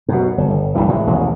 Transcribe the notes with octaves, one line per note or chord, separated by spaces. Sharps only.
F#2 B2
G1
G1
D#1 B1 G2 E3
A2 E3 G#3
E1 A1 D#2 G#3